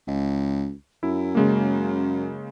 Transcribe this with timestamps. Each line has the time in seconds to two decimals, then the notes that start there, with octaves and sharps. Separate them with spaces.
0.07 C#2
1.03 F#2 E4
1.35 C#3 G#3 A#3